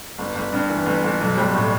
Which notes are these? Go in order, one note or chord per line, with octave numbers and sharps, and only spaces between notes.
G1
G1
G2
E3
G1
G1
B1
G3
A2